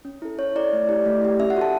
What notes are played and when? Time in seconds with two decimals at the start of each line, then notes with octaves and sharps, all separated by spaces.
0.05 C#4
0.22 E4 A4
0.38 C#4 C#5
0.56 E4 A4 D5
0.73 A3
0.89 E4 G4
1.06 A3
1.22 E4 G4
1.39 C#4 E5
1.50 F#5
1.56 F#4 A4 A5